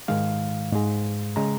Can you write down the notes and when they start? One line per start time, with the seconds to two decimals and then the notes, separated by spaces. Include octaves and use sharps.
0.08 G#2 D#3 G#3 F5
0.72 G#2 G#3
1.36 C#3 G#3 A#5